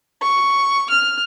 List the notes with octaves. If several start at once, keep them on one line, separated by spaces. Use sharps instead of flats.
C#6
F6